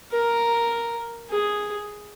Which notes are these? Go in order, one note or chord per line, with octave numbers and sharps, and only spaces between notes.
A#4
G#4